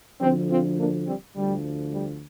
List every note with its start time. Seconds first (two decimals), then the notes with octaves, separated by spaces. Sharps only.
0.20 D2 D3 F3 G3 C4
0.49 C4 F4
0.78 A#3 D4
1.06 G3 C4
1.35 D2 D3 F3 G3
1.93 G3